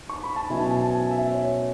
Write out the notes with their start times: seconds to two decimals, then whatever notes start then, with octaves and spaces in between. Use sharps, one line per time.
0.10 C#6
0.23 B5
0.36 A5
0.50 B2 F#3 C#4 E4 G#5
0.71 A5
0.82 A5
0.91 G#5
1.11 E5
1.32 C#5